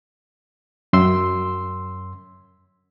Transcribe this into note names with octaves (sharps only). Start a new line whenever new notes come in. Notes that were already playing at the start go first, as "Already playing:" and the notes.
F#2 C6 E6